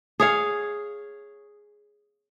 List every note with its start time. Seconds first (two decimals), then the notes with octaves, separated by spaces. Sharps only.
0.20 G#4 C#5 F5